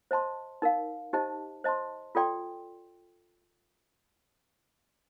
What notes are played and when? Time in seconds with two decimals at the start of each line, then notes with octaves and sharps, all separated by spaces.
0.11 C5 D#5 A5 C6
0.62 D#4 A#4 F5
1.13 D#4 G4 C5 D#5 A5
1.64 C5 D#5 A5 C6
2.15 F4 A4 D5 G5 C6